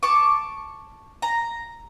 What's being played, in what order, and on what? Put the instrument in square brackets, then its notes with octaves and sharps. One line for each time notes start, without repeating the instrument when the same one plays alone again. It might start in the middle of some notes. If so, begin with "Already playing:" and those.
[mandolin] A5 C#6 D6
A#5